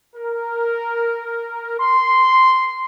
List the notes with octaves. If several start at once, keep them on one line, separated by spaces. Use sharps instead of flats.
A#4
C6